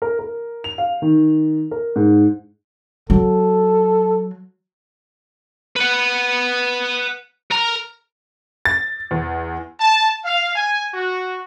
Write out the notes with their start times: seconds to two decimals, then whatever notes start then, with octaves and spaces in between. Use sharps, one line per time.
0.02 A#4
0.19 A#4
0.64 F7
0.78 F5
1.02 D#3
1.71 A#4
1.96 G#2
3.10 F#3 A4
5.76 B4 F#5
7.51 A#4 A#5
8.65 A6
9.11 E2
9.80 A5
10.24 F5
10.55 G#5
10.93 F#4